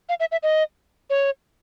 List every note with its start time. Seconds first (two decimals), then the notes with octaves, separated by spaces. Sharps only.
0.09 F5
0.20 E5
0.32 E5
0.43 D#5
1.10 C#5